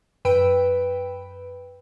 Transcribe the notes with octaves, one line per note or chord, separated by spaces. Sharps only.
F#2 B4 G5 B5 E6 D7